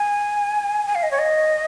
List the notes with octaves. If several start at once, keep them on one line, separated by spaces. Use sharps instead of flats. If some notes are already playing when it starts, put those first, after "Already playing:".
Already playing: G#5
G#5
F5
D#5
C#5
D#5